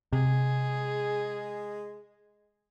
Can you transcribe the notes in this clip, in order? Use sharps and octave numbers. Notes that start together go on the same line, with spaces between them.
C3 G#3 G#4